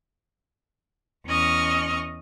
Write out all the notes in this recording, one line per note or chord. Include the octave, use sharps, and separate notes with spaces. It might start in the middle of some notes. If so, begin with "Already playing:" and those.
E2 C#4 D#5 C#6 F6